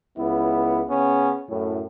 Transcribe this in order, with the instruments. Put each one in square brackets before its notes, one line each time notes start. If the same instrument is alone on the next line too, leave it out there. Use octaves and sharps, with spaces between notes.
[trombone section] C#2 B3 E4
C#3 B3 C#4
F#2 A2